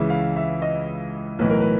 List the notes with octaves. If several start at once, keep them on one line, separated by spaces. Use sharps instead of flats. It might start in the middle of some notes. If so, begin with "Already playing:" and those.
Already playing: C#2 C#3 E3 E5
F5
E5
D#5
B1 A2 E3 B4
A#4
B4